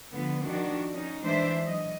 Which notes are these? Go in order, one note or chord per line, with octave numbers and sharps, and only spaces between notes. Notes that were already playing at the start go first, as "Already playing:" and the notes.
D3 F3 B3
D#3 F3 D4 F#4
C#4 D#4
E3 G#3 D4 C5 E5
F#3 D#5